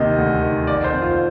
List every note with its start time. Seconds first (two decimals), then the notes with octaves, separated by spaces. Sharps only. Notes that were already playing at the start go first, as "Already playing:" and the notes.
Already playing: D#2 C3 D#3 D#5
0.18 D2
0.42 D#3
0.67 F2 D5
0.84 C5
0.93 F2
1.02 F4